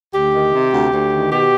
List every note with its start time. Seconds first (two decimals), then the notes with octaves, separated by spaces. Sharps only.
0.14 D2 G4
0.34 D#3
0.54 C3
0.73 D2
0.93 D2
1.12 D#3
1.32 B2 G4